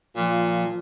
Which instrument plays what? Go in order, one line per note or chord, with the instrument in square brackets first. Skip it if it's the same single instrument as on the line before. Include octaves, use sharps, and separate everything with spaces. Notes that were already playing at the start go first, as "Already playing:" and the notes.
[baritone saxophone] A#2 [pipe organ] F3